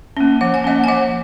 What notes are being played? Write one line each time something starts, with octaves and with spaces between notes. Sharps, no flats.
A#3 C#4
F3 F#5
G#5
A#3 C#4 D#5 F#5
G#5
F3 D#5 F#5